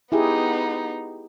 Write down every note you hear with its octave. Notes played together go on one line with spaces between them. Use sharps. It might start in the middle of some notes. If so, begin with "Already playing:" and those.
B3 D#4 E4 G4 G#4